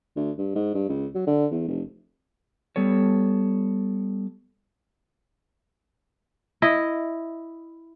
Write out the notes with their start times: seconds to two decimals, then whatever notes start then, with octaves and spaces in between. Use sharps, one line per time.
0.16 D2
0.38 G2
0.55 G#2
0.74 G2
0.89 C#2
1.15 F#3
1.27 D3
1.51 E2
1.67 F1
2.76 G3 B3 A4 C#5
6.62 E4 D#5